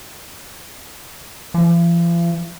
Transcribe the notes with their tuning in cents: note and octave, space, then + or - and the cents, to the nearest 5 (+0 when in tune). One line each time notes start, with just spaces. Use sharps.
F3 -45